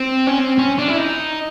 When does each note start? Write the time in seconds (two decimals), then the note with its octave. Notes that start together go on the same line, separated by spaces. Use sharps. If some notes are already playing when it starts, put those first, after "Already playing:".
Already playing: C4
0.27 C#4
0.39 C4
0.58 C#4
0.78 D4
0.88 E4
0.98 D#4